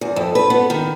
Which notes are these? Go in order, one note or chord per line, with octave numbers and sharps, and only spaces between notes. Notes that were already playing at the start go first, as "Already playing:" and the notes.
E2
F2
B4
B3
D#3